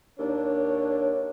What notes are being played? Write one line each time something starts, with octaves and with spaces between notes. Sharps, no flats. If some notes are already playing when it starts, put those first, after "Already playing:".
D#2 D4 C#5